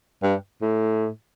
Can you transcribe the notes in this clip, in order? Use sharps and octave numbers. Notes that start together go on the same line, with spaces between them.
G2
A2